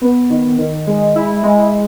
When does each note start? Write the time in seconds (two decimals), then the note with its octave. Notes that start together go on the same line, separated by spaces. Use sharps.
0.01 B3
0.30 D#3
0.58 D#3
0.87 G#3
1.16 E4
1.43 G#3